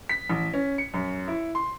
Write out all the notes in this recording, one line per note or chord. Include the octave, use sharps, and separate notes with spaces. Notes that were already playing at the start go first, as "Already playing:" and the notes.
B6
A1
C#4
C#7
F#2
E4
C6